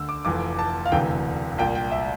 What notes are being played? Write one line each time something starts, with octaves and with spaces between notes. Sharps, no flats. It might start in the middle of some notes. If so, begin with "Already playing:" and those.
Already playing: D2 D3 E6
D6
F1 F2 E3 D6
A5
F5
E1 D2 C3 E3 G5
C2 A#2 G5
G5
E5